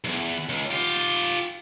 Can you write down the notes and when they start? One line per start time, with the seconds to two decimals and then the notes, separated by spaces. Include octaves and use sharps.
0.04 B1 E2
0.49 C#2
0.71 F4 G4